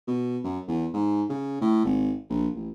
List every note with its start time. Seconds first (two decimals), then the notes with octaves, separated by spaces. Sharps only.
0.07 B2
0.44 F#2
0.68 E2
0.94 G#2
1.30 C#3
1.61 A2
1.85 G#1
2.30 A#1
2.55 A1